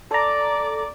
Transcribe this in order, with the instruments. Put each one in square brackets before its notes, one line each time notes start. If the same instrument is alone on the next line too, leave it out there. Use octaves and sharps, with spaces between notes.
[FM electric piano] A4 A#5 [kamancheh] D5 D6